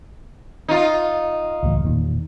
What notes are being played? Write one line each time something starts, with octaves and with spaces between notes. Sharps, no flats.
D#4 F4
C#2 A2 E3
E1 A#2 D#3